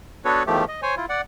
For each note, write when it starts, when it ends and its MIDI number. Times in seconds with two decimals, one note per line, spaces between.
0.25 0.43 59
0.25 0.43 62
0.25 0.43 66
0.25 0.43 69
0.25 0.43 71
0.25 0.43 73
0.47 0.65 40
0.47 0.65 51
0.47 0.65 53
0.47 0.65 57
0.47 0.65 67
0.68 0.81 75
0.82 0.95 72
0.82 0.95 73
0.82 0.95 80
0.97 1.06 64
0.97 1.06 65
1.09 1.21 74
1.09 1.21 78